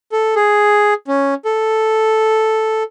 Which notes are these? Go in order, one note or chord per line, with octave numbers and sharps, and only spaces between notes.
A4
G#4
C#4
A4